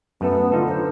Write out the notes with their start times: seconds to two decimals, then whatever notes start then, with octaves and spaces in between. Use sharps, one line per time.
0.21 F#2 A3 B3 A4
0.52 D3 D#4 F4 A4
0.68 C5